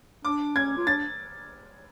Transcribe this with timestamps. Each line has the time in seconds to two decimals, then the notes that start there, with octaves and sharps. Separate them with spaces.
0.25 D4 D6
0.56 C#4 G#6
0.77 F4
0.87 D4 A6